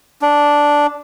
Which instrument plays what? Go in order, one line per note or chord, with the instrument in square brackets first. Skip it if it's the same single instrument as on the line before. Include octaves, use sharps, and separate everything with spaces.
[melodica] D4